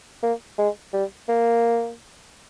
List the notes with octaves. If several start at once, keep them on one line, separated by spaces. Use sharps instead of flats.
A#3
G#3
G3
A#3